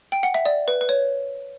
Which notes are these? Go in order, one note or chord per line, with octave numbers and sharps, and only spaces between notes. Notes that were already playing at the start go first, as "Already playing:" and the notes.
G5
F#5
E5
D5
B4
B4
C#5